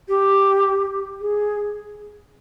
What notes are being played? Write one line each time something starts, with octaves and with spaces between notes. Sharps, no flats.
G4
G#4